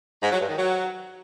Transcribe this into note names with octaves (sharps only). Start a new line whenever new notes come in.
G#2
F#3
G2
D#3
F#3